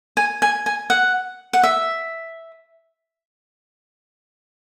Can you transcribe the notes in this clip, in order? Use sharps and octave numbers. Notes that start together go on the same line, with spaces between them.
G#5
G#5
G#5
F#5
F#5
E5